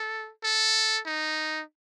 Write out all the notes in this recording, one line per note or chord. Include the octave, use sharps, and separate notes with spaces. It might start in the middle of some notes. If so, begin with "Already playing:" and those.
Already playing: A4
A4
D#4